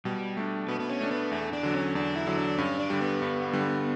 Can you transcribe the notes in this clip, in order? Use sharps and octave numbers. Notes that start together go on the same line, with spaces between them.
B2 G3
A3 D4
B2 B3
B3
C#4
A3 D4
B3
E2 A3
D4
D3 F#3
C#4
E2 D4
E4
D3 F#3
D4
G2 C#4
D4
D3 G3
B3
G2
D3 G3